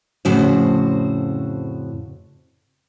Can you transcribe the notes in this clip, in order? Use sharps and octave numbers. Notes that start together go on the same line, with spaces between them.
F2 A2 C#3 F#4 C5